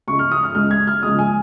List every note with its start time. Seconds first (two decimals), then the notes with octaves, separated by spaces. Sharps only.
0.07 C#2 C#3 G#3 C#6
0.19 F6
0.31 D#6
0.43 F6
0.55 C#2 C#3 G#3 F6
0.71 G#6
0.87 F6
1.03 C#2 C#3 F3 G#3 D#6
1.19 G#5